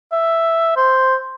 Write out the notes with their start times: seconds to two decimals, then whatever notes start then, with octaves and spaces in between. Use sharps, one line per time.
0.12 E5
0.77 C5